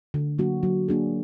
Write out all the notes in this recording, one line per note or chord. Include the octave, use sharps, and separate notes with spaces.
D3
F#3 A#3 D4 F#4
F#3
A#3 D4 G#4